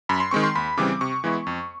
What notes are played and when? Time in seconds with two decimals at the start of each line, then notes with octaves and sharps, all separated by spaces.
0.09 F#2 B5
0.20 C6
0.31 D#3 G#3 C4 C#6
0.43 C6
0.55 D#2 B5
0.77 C#3 E3 G3 C4 D6
1.01 C3 C#6
1.24 E3 G#3 B3 E4
1.47 F2